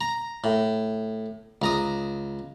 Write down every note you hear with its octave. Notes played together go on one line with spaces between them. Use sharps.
A#5
A2
C#2 A#5 D#6